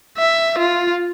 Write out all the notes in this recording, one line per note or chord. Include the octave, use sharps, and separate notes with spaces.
E5
F4